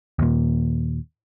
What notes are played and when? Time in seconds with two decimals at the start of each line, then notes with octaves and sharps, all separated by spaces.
0.19 D#2 A#2